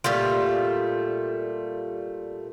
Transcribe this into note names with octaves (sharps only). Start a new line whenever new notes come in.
A#2 G3 A3 F4